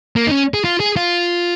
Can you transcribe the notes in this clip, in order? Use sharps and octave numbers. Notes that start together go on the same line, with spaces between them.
A#3
D#4
C#4
G#4
F4
G#4
F4